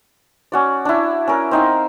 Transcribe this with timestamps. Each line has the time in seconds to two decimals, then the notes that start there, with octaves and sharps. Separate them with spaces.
0.52 C#4 F#4 D5
0.85 D4 E4
1.28 C#4 A#4
1.51 C4 D#4 F5